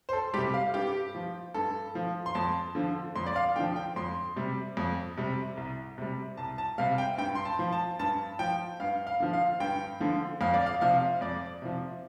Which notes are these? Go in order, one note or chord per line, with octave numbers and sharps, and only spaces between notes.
C5
A4
C3 G3 G4
F5
G2 G4
F3
G2 A4
F3
C6
F2 A5
D3 F3
F2 C6
D5
F5
D3 F3 G5
G5
F2 C6
C3 G3
F2
C3 G3
C2
C3 G3
C2 A5
A5
C3 G3 F5
G5
G2 G5
C6
A5
F3
A5
G2 A5
F3 G5
G2 F5
F5
D3 F3
F5
G2 G5
D3 F3
F2 F5
D5
F5
C3 F3 F5
F2 D5
C3 F3